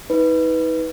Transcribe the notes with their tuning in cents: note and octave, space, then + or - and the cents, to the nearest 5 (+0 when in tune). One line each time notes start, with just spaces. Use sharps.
D#4 +40 B4 +0